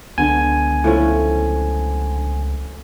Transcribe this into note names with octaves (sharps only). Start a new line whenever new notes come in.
C#2 D3 B3 G#5
A2 F3 C#4